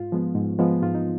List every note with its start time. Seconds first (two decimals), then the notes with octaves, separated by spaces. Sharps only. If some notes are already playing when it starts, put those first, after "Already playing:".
Already playing: G#2 F4
0.12 F3 G#3 B3
0.35 G#2
0.59 F3 G#3 B3
0.83 G#2 F4
0.95 D#4